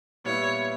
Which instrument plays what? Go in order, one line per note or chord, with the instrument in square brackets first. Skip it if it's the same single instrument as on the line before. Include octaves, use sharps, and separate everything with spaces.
[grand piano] A#2 G3 B3 E4 [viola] C#5